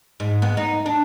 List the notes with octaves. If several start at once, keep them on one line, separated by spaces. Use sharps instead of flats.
G#2
B3
D#4
D4